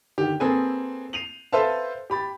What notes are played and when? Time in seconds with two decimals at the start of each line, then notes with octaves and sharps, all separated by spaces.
0.18 D3 D#3 G4
0.40 A#3 C4 G#4 A4 B4 G#5
1.13 C7 D#7 F7 F#7
1.53 A4 B4 C5 E5 F5 A5
2.10 G4 B5 A6